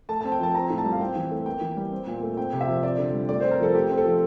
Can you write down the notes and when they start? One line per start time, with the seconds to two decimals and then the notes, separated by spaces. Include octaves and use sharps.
0.09 A3 A5
0.21 C4 A5
0.32 G5
0.40 F3 A5
0.55 C4 A#5
0.70 A2
0.78 A5
0.85 G3
0.92 F5
1.00 C4 G5
1.16 E3
1.31 A3
1.46 A#3 G5
1.61 E3
1.77 G3
1.91 C4
2.07 A#2
2.22 A3
2.37 C4 G5
2.53 C3
2.61 E5
2.68 F3
2.83 C4 D5
2.98 D3
3.14 G3
3.29 A3 D5
3.40 C4 C5
3.51 A#4
3.59 F3 A4
3.75 A3 G4
3.90 C4
3.97 A4
4.05 F3